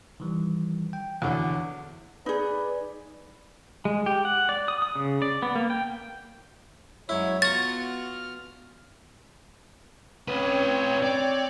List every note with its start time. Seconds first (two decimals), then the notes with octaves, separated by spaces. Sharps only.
0.20 D#3 E3 G3
0.93 G5
1.22 E2 D3 F#4 C#5 F#5
2.26 D#4 G#4 B4 D5
3.85 G#3
4.06 G4
4.25 F#5
4.49 D5
4.68 D#6
4.82 D#6
4.96 C#3
5.22 D5
5.42 B3
5.55 A#3
5.70 G5
7.09 F#2 F#3 G#3 E4 C#5
7.42 B3 F4 F#4 A#5 C#6 F6 A6
10.28 C4 C#4 B4 C#5
11.03 D5